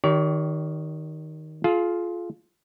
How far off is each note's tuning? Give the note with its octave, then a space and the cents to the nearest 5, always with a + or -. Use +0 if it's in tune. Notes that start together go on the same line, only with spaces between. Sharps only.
D#3 +0 G4 -25 C#5 +45
F4 +0 G#4 +40 F5 +0